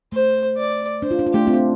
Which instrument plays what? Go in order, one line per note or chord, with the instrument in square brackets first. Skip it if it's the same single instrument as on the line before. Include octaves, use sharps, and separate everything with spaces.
[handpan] A3 [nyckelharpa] C5
[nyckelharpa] D5
[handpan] D4 [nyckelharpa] C5
[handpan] F4
D4
F4
[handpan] A3 D4 [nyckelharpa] G4
[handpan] C4 F4